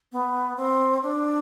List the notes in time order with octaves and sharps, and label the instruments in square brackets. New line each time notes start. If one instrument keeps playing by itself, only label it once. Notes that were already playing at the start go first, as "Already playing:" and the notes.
[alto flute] B3
C4
D4